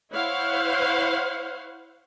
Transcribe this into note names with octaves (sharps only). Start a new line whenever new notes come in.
E4 C5 C#5 F5 F#5